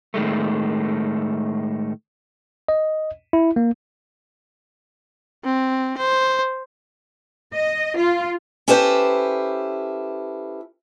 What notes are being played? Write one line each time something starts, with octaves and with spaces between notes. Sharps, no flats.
A2 D#3 G#3 A3
D#5
E4
A#3
C4
C5
D#5
F4
C#4 E4 G4 A4 B4 C5